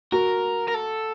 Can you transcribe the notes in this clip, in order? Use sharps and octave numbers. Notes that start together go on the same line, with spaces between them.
F#4 A#4
A#4
A4